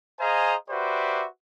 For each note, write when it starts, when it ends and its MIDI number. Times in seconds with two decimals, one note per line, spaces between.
0.20 0.55 68
0.20 0.55 72
0.20 0.55 75
0.20 0.55 77
0.20 0.55 80
0.20 0.55 82
0.70 1.25 66
0.70 1.25 67
0.70 1.25 71
0.70 1.25 72
0.70 1.25 74
0.70 1.25 76